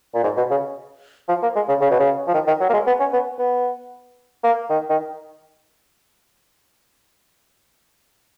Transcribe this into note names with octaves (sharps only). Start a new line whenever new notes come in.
A#2
G#2
B2
C#3
F3
A#3
G#3
C#3
C#3
B2
C#3
F3
D#3
D#3
F#3
A#3
G#3
B3
C#4
B3
B3
A#3
D#3
D#3